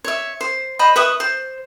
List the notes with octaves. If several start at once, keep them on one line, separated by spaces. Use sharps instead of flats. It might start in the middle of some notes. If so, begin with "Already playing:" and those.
C#5 E5
C5
C5 D#5 B5
B4 E5 C#6 D#6
C5